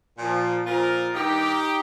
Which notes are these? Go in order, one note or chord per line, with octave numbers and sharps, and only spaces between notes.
A#2 F3
A#2 F3 F4 A#4
G2 D#3 D#4 G4